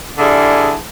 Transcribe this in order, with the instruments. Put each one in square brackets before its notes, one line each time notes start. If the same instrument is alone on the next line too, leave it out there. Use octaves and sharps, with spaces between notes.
[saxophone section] D3 G3 E4 G#4